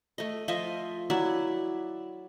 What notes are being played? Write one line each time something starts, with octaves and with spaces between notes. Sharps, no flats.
A3 D#5
F3 F4 D#5 E5
F#3 E4 D5 E5